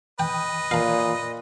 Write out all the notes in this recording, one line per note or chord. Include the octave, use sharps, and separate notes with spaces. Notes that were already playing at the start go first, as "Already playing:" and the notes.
B4 D#5 G5
A#2 F5 A#5